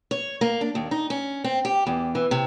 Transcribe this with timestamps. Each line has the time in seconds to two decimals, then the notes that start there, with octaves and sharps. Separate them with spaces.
0.11 C#5
0.41 A#3
0.61 D4
0.75 D#2
0.91 D#4
1.10 C#4
1.44 C4
1.65 G4
1.86 E2
2.15 E3
2.31 C3